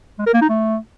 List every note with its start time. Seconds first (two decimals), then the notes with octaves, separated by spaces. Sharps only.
0.19 G#3
0.26 A#4
0.34 A#3
0.42 D#4
0.49 A3